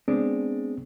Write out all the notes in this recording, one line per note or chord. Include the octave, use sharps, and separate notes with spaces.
G#3 B3 C4 D4